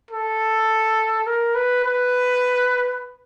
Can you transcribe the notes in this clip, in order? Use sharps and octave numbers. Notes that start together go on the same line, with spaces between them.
A4
A#4
B4
B4